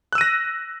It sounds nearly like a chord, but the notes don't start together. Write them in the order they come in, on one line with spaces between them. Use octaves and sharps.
F#6 E6 D#7 A#6